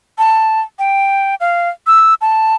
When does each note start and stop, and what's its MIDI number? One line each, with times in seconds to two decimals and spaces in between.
0.18 0.61 81
0.79 1.35 79
1.40 1.69 77
1.87 2.14 88
2.21 2.55 81